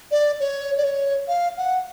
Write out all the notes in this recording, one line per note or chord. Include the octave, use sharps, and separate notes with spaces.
D5
C#5
D5
C#5
F5
F#5